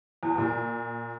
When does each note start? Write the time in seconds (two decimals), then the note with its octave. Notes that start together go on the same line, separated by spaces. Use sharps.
0.23 E2
0.38 A#2